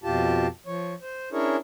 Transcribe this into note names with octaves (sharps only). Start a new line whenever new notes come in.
F2 B2 F4 G4 A5
F3 C#5
C5
C#4 D4 E4 G#4 A#4 C#5